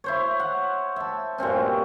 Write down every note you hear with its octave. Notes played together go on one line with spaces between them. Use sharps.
E4 C5 C#5
F#5
E5 A5
G2 A#2 C4 C#4